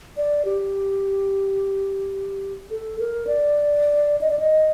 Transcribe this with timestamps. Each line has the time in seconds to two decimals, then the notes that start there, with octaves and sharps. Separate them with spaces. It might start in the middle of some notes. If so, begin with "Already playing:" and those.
0.17 D5
0.45 G4
2.71 A4
2.99 A#4
3.27 D5
4.21 D#5
4.30 D5
4.39 D#5